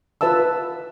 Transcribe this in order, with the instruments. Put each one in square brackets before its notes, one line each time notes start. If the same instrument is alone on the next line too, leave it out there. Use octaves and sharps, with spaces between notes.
[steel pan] F4 B4 E5 A5 E6